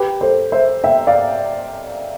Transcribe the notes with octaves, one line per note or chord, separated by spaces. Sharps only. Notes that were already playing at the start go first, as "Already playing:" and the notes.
Already playing: G4 B4
A4 C5
C5 E5
E5 G5
D5 F5